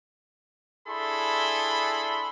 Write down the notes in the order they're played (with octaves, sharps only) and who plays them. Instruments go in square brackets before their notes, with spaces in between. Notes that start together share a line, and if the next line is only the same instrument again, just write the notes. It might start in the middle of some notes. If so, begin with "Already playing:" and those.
[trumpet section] D4 E4 G#4 A4 B5 C6